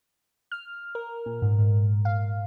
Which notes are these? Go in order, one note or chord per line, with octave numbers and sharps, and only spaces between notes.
F6
A#4
A#2
G#2
G#2
F5